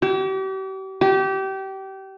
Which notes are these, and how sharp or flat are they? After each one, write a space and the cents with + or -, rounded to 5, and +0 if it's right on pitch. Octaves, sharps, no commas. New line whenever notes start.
G4 -40
G4 -25